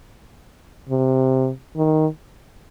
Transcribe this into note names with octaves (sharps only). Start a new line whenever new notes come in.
C3
D#3